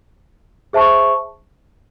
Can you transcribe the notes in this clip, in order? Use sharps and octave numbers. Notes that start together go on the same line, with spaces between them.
G#4 C5 E5 A5 C#6